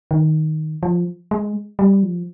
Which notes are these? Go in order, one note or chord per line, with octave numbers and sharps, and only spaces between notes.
D#3
F3
G#3
G3
F3